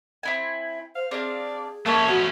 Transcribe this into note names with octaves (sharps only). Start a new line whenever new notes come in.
C4 E4 G#5
C5 F5
C4 D4 G#4 D5 F5
A3 A#3 C#4 A4 C#5 E5
B3 F#4 C#5